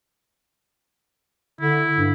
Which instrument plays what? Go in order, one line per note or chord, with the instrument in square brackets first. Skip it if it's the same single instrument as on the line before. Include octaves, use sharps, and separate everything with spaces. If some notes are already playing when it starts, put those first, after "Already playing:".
[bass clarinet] D3 [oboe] E4
[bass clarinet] G2